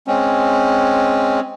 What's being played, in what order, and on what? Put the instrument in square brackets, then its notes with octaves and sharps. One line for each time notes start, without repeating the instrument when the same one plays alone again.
[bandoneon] G#3 C4 C#4